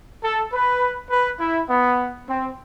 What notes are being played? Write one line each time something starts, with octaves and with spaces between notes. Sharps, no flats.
A4
B4
B4
E4
B3
C4